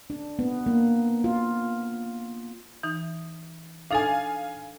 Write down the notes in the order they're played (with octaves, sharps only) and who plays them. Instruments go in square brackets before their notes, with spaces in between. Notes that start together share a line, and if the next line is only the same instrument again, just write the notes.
[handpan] D4
B3
A#3
F4
[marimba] E3 D#4
[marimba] D4 D#4 A4 [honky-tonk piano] F5 G#5